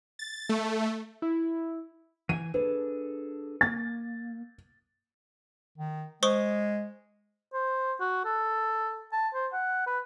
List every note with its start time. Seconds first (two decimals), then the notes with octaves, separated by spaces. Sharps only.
0.19 A6
0.49 A3
1.22 E4
2.29 E3 F#5 G#5 D#7
2.54 D4 G#4 A4 B4
3.61 A#3 A6
5.78 D#3
6.23 G#3 C5 C#6 D#6
7.54 C5
8.00 F#4
8.25 A4
9.12 A5
9.34 C5
9.53 F#5
9.87 B4